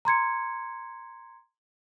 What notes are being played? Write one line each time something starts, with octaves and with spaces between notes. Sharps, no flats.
A#5 C6 G#6 C#7